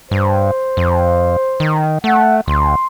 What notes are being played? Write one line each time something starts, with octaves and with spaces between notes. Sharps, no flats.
G2 C5
F2
D#3
A3 F#5
D2 C6